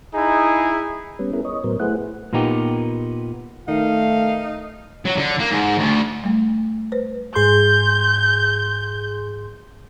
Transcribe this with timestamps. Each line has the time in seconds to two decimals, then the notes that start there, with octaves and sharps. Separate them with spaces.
0.15 D#4 E4 G#4
1.19 G3 B3 C#4
1.33 B3 C#4 E4 G#4 A#4
1.45 C#5 D#5
1.64 A2 F#3 B3 A#4 C5
1.80 A3 E4 G#4 B4 C5 F#5
2.33 A#2 A#3 B3 D#4 G4
3.68 D#3 A3 D#4 F5
5.05 F#3
5.17 D3
5.39 A#3
5.51 G#2
5.78 D2
6.24 G3 A3
6.92 B4 C5
7.35 G#2 G#4 C6 G6